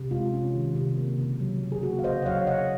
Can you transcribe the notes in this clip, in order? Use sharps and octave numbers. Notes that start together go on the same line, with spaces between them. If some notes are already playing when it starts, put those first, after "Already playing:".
Already playing: C3
G#3 F4
C#4
D#3
C3
A#3
C#3
F#3
C#3
G#4
A#3 F#4
F5
C#3 C5 D#5
F#5
F#3 C#5 F5
C#3 D#5 F#5